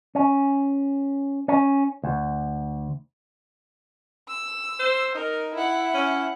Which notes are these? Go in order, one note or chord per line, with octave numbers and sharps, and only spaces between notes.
C#4
C#4
D2
E6
C5
D#4 A#4
E4 F#5
C#4